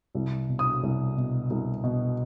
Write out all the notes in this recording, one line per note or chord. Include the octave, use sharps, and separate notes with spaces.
C2
B2
D#6
C2
B2
C2
B2